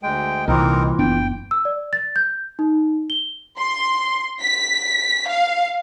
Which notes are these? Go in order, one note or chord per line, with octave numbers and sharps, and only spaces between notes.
D2 G#3 G5
C2 A#2 E3 C4 D#4 A#4
F#1 B3 D4 G5
E6
D5
A6
G6
D#4
G7
C6
B6
F5